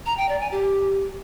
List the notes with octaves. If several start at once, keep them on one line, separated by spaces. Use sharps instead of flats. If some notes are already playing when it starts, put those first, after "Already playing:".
A#5
G5
D5
G#5
G4